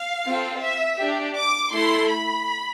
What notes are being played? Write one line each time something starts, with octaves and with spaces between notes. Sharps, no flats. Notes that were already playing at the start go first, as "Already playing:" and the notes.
Already playing: F5
C4 F4 A4
E5
D4 G4
D6
A3 E4 A4 C6
B5